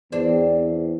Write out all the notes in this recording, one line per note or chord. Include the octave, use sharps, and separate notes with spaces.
E2 C4 D4